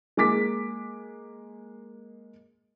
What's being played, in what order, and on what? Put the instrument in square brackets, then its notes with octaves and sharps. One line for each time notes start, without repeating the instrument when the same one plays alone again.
[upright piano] G#3 A#3 D6 B6